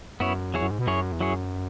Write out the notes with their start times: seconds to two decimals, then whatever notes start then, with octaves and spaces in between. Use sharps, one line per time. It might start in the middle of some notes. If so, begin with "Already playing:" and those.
0.20 F#2 B3 E4 C#5
0.54 E2 F#3 E4 G#4 C#5
0.62 F#2
0.71 G#2
0.79 B2
0.87 F#2 F#3 E4 G#4 C#5
1.12 E2
1.20 F#2 F#3 E4 G#4 C#5